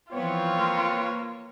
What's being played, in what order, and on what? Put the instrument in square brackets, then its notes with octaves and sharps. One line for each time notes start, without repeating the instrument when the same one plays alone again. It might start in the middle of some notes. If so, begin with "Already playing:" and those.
[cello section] E3 F3 B3 [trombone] C4 [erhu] F4 [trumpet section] B4 C#5
[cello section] A#3